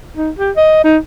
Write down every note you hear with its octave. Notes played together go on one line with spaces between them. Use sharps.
D#4
G4
D#5
D#4